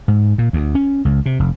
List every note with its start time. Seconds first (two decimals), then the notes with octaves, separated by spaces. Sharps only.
0.08 G#2
0.38 A#2
0.53 D2
0.75 C#4
1.05 C#2
1.26 C3
1.40 F1